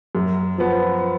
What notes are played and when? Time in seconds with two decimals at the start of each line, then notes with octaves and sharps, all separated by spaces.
0.15 F#2
0.58 F3 B3